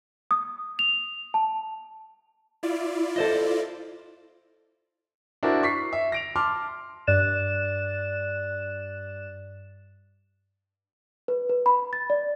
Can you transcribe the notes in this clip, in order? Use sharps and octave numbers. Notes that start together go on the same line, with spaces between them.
D#6
F7
A5
E4 F4 D5
A4 C5 D#5
D4 E4 F#4 A#4 C5
C#6 B6 C7
E5
A#6 D7 F7
A5 C6 D6 F6
G2 D5 F#6 A6 E7
B4
B4
B5
A6
D5